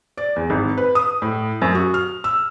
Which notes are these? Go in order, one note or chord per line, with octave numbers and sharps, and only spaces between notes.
D5
E2
G#1
B4
D#6
A2
F#2
F#4
F6
E6